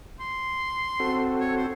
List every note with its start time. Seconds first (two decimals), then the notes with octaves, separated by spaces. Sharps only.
0.20 C6
1.00 C4 F#4 A4
1.41 C#5
1.57 C5